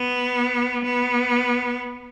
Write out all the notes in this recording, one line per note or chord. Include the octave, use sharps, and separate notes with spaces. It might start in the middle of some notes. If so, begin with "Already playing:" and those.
Already playing: B3
B3